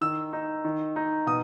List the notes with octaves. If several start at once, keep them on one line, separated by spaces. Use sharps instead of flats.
D#3 E6
D#4
D#3
D#4
B2 D#6